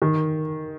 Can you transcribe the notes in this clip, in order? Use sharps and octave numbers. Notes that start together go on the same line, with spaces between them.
D#3